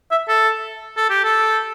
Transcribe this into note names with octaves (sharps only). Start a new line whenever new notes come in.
E5
A4
A4
G4
A4